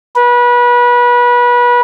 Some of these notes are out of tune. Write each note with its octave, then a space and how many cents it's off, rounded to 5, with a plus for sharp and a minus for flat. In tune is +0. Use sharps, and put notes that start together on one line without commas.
B4 -25